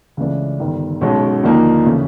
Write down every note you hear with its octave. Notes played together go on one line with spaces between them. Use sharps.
C#2 C#3 E3 A3 D4
G1 G2 D#3
B1 B2 G#3 C#4
D#2 D3 F3 A#3 D#4
C#3 E3 A3